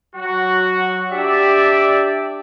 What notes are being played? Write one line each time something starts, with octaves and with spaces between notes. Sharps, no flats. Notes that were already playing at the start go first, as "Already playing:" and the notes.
F#3 F#4
D4 G4 D5 E5